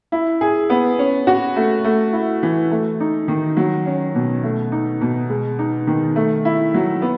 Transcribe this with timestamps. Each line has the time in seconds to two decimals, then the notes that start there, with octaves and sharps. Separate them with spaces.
0.12 E4
0.41 G#4
0.70 B3
0.99 C#4
1.27 F#4
1.56 A3
1.84 A3
2.13 E4
2.43 E3
2.71 A3
3.00 D#4
3.28 D#3
3.57 F#3
3.86 C#4
4.15 B2
4.43 A3
4.72 D#4
5.01 B2
5.29 G#3
5.59 D#4
5.87 D#3
6.16 A3
6.45 E4
6.74 F#3
7.02 B3